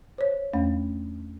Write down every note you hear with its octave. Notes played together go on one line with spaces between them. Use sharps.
C5 C#5
E2 A3 C#4